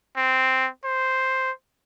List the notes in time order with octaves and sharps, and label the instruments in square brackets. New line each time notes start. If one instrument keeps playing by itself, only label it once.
[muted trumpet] C4
C5